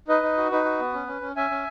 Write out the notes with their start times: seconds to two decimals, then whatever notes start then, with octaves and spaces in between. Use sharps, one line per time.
0.08 D#4 B4 D#5
0.23 D#4
0.37 F#4
0.51 D#4 B4
0.65 F#4
0.80 B3
0.94 C#4
1.07 C#4
1.21 C#4
1.36 C#4 E5 G#5
1.50 C#4